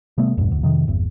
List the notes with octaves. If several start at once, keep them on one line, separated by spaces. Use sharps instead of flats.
C3 G3 A3 B3
E1 A1 G2
F1 D2
F2 C3 D#3
G1 E2